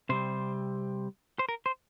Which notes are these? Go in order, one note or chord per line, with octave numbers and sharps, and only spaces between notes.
C3 G3 C4 C5
C5
A#4
C5